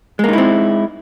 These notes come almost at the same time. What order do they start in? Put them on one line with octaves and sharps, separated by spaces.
G#3 A#3 D#4 E4 C4